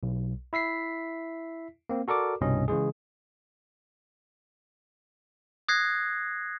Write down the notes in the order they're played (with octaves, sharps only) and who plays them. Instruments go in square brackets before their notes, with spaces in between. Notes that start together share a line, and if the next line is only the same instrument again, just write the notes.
[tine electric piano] B1
E4 E5 B6 C7
A#3 C4
F#4 A4 A#4 D5 D6
C2 G2 B2 C#4 D#5
C#3 E3 G#3 G#4
[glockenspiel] D#6 F#6 G#6 A#6 C7